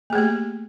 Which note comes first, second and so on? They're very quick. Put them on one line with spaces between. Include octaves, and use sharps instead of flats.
A#3 G#4 A3 G4